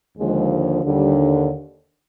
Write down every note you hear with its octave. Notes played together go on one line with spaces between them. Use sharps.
D#2 D3 F3 G#3
D#2 D3 G3